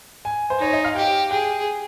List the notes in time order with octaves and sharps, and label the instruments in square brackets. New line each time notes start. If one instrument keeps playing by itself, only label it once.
[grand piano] G#5
C5
[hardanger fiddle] D#4 [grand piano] C#5
[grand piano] D#5
F5
[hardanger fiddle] G4 [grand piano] G5
[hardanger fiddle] G#4 [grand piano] G5